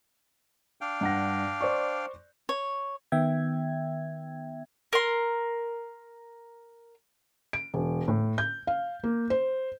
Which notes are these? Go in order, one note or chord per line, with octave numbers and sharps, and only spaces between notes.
D4 F5 G5
G2 F#5 A#6
C5 D5 C#6
C#5
D#3 B3 E5 G5 G#6
A#4 C6
D7
E1
A2
G6
F5
A#3
C5